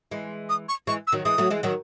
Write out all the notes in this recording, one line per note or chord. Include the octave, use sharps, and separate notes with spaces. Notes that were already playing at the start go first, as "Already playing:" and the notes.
E3 G#3
D#6
C#6
E3 G#3 C#6
E6
D#3 F#3
E3 G#3 D#6
F#3 A3
E3 G#3
D#3 F#3